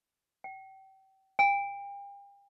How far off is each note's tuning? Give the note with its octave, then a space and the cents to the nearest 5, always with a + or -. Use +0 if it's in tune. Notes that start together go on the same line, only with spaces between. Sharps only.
G5 -35
G5 +40